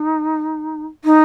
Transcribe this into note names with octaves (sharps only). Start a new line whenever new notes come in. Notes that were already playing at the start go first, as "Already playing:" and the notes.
Already playing: D#4
D#4